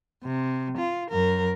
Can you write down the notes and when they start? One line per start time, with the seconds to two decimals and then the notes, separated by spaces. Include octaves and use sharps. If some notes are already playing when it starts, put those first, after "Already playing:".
0.24 C3
0.77 F4
1.10 F#2 A#4